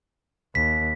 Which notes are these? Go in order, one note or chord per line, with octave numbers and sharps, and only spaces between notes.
D#2 B6